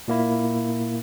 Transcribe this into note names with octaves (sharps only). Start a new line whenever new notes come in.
A#2 A#3 E4